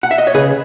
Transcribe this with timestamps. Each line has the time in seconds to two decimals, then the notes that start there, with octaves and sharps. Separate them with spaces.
0.03 F#5
0.11 E5
0.18 D#5
0.27 C#5
0.34 C#3 G#4 B4